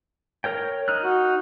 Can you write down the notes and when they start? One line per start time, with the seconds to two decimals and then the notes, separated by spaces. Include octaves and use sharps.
0.44 A#4 C#5 G5
0.88 D#4 F6 F#6
1.04 F#4